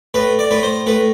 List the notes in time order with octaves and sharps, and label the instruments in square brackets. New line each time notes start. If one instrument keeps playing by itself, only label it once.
[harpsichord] A2 B4
D5
A2 B4
C5
A2 B4